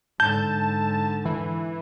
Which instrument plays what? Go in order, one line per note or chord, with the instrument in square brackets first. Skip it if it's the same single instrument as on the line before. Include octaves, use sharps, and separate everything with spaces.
[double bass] G#2 D3 [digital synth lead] A5 [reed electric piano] G6
[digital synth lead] E3